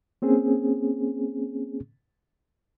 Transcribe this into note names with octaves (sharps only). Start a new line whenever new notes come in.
A#3 C4 C#4 G#4